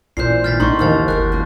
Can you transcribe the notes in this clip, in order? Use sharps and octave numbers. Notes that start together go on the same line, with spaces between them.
A#1 A#2 E3 D4 C5 G6 C7
B2 D#3 E3 F6 A6 B6
A2 D#4 C5 C6 C#6
D#2 D#3 E3 A#4 C5 D#5 F6 A6
G1 F#4 G#4 A#4 F#6
A#3 D4 F4